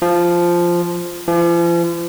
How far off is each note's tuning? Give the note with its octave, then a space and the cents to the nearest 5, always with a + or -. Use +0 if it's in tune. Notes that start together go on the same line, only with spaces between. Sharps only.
F3 -5
F3 -40